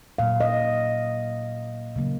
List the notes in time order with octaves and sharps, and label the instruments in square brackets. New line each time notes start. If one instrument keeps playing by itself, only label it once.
[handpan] A#2 F#3 A#3 F5
D#5
C#3 F#3 A#3